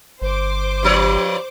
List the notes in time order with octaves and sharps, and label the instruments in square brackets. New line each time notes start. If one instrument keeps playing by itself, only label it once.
[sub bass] G1 [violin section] C5 D6
[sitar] G2 F3 C#5